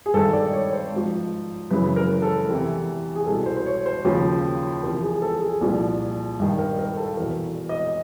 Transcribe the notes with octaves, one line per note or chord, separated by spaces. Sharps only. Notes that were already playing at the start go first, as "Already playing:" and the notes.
G#4
G2 D#3 A4
D5
C#5
C5
G#2 F3
F#2 C#3 E3 B4
A#4
A4
E2 C3 E3
G#4
C2 B2 A4
C5
C5
C#5
C5
D#2 C#3 F3
E2 C3 F3 A#4
G#4
A4
G#4
C2 A#2 F3
G2 D#3
A#4
A#4
A4
E2 B2 A#4
D#5